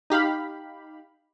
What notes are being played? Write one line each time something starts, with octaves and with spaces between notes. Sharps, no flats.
D#4 G4 F5 B5